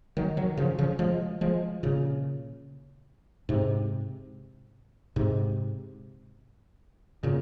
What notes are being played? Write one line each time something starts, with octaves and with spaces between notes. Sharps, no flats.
D#3 F#3
D#3 F#3
C#3 F3
C#3 F3
F3 G#3
F3 G#3
A#2 C#3
G#2 C3
G#2 C3
A#2 C#3